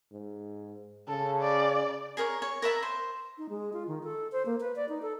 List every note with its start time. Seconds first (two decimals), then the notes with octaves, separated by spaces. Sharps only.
0.12 G#2
1.08 C#3 A4
1.41 D5
2.17 G#4 A#4 C5 C#5
2.42 C#5
2.62 A#4 B4 E5 A5
2.83 C5
3.38 D#4
3.49 G#3
3.73 F4
3.88 D#3
4.04 A4
4.32 C5
4.46 A#3
4.60 B4
4.76 D5
4.89 D#4
5.02 A4